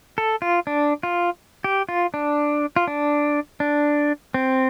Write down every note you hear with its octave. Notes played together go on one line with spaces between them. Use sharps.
A4
F4
D4
F4
G4
F4
D4
F4
D4
D4
C4